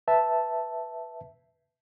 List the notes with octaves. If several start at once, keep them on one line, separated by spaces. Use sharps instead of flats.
B4 E5 A5